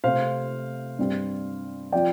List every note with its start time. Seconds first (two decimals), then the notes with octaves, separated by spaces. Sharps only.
0.04 C3 A3 C4 C5 F5
0.99 G2 G3 C4
1.92 F3 C4 D5 G5